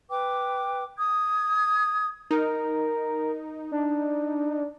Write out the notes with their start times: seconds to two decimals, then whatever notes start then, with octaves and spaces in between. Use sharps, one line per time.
0.10 B4 G5 D6
0.98 D#6 G#6
2.31 D#4 A#4
3.72 D4